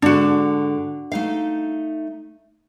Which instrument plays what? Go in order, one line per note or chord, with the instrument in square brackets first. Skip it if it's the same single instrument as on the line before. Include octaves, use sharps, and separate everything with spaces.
[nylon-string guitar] G#2 D3 [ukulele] D4 F#4
[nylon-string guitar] A3 D#4 F5